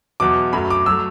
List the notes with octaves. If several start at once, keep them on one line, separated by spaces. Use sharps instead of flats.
E2 B2 F#3 D6
F#2 F#3 A3 B5
D6
F#3 A3 E6